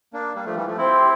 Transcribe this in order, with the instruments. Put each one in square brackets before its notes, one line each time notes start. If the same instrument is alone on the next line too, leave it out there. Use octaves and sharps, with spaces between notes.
[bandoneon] A#3 D4
G3 A#3
F3 A3
E3 G3
F3 A3
[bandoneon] C4 E4 [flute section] G4 C5 G5 C6